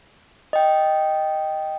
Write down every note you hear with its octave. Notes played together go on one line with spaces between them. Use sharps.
D#5 G5